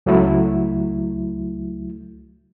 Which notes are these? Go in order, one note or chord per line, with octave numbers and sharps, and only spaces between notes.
C#2 F#3 A3 E4